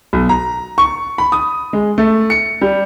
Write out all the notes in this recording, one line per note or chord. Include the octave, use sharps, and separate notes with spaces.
B1
A#5
C#6
B5
D#6
G#3
A3
C#7
G3